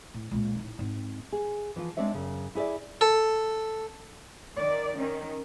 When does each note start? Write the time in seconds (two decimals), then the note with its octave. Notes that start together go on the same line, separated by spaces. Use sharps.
0.14 A2
0.31 C#2 A#2
0.55 A1 D#4
0.79 G#2 C4
1.32 G#4
1.76 E3 F3 F4
1.97 G#3 C4 D4 C#5 E5
2.14 F#2 C#3
2.55 E4 G#4 C#5 D5 E5
3.01 A4
4.57 D#3 D5
4.97 D#3 C#4